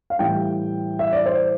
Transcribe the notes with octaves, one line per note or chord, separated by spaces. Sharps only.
F5
A2 E3 G3 G5
E5
D5
C5